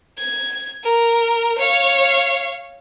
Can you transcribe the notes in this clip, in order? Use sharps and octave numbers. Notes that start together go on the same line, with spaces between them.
G#6
A#4
C#5 F5